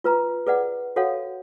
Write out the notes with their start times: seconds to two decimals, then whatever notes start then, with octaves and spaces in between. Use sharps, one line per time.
0.04 F4 B4 A#5
0.47 G#4 B4 D5 F#5
0.96 F#4 A4 C#5 F5 F#5